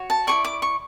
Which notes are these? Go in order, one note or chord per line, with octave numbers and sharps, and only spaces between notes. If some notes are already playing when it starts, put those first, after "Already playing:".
Already playing: F#4 C#5
A5
E4 G#4 D5 C#6
D6
C#6